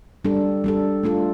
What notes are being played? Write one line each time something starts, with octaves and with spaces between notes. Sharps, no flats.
G3 D4 A4
G3 D4 A4
A3 D4 F4 A4